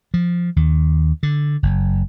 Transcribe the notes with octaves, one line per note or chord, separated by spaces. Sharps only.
F3
D#2
D3
F#1